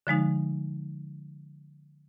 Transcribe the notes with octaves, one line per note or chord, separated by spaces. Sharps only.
D3 F3 G#3 D#4